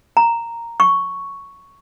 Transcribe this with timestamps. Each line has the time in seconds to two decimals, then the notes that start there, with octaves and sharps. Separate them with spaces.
0.17 A#5
0.80 C#6